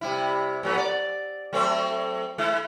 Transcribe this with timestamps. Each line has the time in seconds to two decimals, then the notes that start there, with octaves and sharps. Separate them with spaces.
0.01 C3 G3 E4
0.63 A2 F#3 B3
0.77 D5
1.53 F#3 A3 C4
2.38 G#3 E4